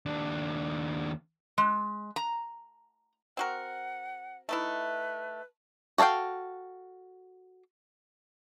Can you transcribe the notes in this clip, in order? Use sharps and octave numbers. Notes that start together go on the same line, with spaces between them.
D#2 D4
G#3
A#5
C4 F#4 A#4 F#5
A3 D#4 E4 B4
F#4 A4 C#5 F5 G5